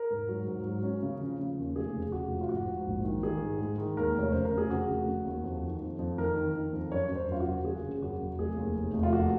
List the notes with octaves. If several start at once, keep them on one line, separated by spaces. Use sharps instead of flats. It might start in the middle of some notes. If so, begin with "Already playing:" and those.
Already playing: A#4
G#2
F#3
G#2
F#3
C#4
C#3
F3
C#3
D#2
F1 G#4
C#3
F1 F#4
F3
F4
G#2 F#4
G#2
A#1
D#3
D#3 G#4
G#2
G#3
D#3
D#2 A#4
F1 C#5
C#3 C5
A#4
F1
G#4
C#3 F#4
F1
C#3
D#2
F2
D#3
F2
F2
D#3 A#4
D#3
D#3
F2
F#2 C#5
F#2
C5
F#2 F4
F#4
F#1
C#3 G#4
C#3
F#2 F#4
F#1
F1 G#4
D#2
F1
F1
F4
D#2 F#4